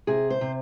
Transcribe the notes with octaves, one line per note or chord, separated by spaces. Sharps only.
C3 G#4
C5
C3